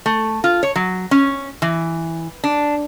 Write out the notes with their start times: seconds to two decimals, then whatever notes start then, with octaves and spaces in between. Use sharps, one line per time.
0.06 A3
0.44 F4
0.63 C#5
0.76 F#3
1.11 C#4
1.62 E3
2.44 D4